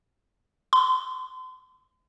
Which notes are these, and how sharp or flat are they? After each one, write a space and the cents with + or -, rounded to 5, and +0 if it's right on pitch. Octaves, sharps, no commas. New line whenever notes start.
C6 -35